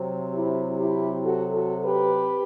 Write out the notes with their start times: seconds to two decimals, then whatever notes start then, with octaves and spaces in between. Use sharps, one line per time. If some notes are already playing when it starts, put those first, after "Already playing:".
Already playing: C3 F#3 C4
0.33 E4 G4
0.78 E4 G4
1.23 F#4 A4
1.54 F#4 A4
1.84 G4 B4